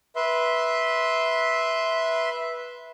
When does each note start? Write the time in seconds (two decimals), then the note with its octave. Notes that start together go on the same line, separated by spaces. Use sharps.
0.16 B4 E5 C6